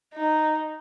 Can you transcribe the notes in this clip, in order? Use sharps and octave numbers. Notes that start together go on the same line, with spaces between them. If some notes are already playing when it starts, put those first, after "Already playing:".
D#4